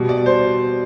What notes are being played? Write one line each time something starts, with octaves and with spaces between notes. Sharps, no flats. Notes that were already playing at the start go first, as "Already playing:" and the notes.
Already playing: B2 G3
D5
C5